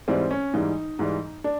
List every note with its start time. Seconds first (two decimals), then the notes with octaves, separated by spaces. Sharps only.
0.08 G#2 E3 G3 C4
0.31 C#4
0.54 G#2 E3 G3 D#4
0.99 G#2 E3 G3
1.44 D4